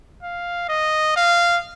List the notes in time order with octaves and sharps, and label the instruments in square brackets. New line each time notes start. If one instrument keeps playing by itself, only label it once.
[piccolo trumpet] F5
D#5
F5